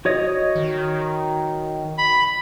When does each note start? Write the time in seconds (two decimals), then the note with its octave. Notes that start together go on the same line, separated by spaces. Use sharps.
0.05 F#4 C#5 D#5
0.56 D#3
1.98 B5